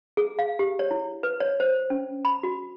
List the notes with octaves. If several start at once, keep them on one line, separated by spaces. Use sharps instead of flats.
G#4
F5
G4
C#5
E4
B4
C#5
C5
C#4
B5
F#4